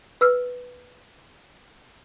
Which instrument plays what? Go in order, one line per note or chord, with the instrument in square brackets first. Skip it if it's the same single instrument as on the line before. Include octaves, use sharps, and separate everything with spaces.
[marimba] B4 E6 F6